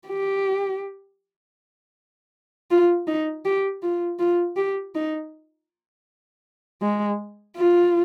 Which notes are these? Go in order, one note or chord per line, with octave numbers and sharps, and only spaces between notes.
G4
F4
D#4
G4
F4
F4
G4
D#4
G#3
F4